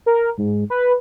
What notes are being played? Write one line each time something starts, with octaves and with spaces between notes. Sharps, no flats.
A#4
G#2
B4